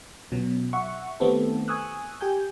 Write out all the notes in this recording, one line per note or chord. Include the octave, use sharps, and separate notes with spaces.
B2 F#3 C#4
E5 F#5 C#6
D#3 A3 B3 C4 G4 A4
G#5 C#6 D#6 E6 F#6
G4 G5 G#5 G6